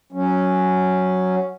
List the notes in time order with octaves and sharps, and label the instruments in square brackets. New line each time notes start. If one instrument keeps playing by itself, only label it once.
[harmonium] F#3 C#4